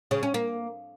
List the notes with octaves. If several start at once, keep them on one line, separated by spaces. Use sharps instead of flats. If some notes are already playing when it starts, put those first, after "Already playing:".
C#3
C#4
A#3